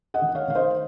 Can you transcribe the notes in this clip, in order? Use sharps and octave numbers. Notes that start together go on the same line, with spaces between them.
D#5 F#5
D#3
C#5 F5
D#3 F5
C5 D#5